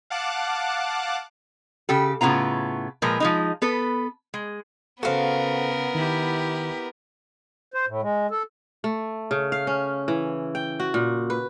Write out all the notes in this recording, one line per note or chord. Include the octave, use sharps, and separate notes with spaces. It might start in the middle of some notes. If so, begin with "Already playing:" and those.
F5 F#5 A5 D6 F#6
C#3 G4 A4
A2 C#3 B3 F4 A#5
A#2 F3 G#3 A#4 B4
F3 G#3 D#4
B3 A4 B4
G#3
C#3 B3 F#4 A4 A#4 C5 F5
D#3 E4 G4
C5
A2
G#3
A4
A3
C#3
F5
C#4
E3
G5
F#4
A#2
B4